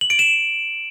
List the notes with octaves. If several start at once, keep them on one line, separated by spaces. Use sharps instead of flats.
F#7
D7
E7